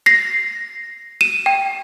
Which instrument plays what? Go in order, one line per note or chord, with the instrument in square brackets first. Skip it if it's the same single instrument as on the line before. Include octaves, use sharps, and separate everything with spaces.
[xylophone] A#6 C7
D#7 E7
G5